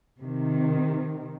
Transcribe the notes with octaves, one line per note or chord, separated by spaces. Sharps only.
C3 D#3